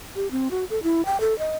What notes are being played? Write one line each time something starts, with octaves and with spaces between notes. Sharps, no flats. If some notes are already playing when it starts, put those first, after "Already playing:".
G4
C4
F#4
A4
E4
G5
A4
D#5